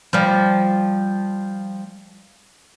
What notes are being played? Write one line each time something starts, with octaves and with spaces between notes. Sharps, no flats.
F3 G3